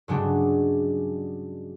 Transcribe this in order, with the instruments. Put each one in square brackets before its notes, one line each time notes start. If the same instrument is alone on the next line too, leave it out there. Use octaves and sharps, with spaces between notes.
[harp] G2 C#3 F#3 G#3 D4